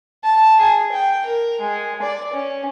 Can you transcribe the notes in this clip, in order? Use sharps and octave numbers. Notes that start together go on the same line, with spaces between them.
A5
G#4
G5
A#4
G#3
D5
C#4